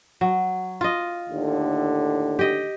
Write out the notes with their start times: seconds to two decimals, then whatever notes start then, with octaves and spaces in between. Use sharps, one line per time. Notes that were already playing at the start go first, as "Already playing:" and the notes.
0.21 F#3
0.81 F4 D#5
1.29 D#2 A2 D3
2.39 G4 D#5